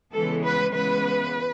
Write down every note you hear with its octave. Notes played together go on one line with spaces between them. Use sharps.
C#3 E3 G#3 B3 A4
B4
C#3 E3 G#3 B3 B4